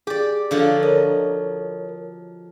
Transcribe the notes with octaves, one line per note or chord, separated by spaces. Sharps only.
G4 G#4 D5
D3 F3 F#3
A#4 C#5 D#5